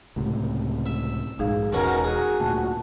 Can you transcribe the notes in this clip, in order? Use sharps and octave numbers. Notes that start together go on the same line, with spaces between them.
C#2 A2 C3
E5
A#1 G#2 D#4 G#4 F5
E1 B2 C#4 F#4 A#4
F#4 G#4
D2 A#2 A5